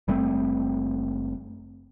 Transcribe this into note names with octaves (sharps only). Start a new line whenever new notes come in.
F#1 G3 A3 C4